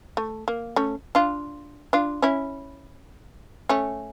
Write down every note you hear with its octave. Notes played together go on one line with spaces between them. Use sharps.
A3
A#3
A3 C#4
D4 F4
D4 F4
C#4 E4
A3 C#4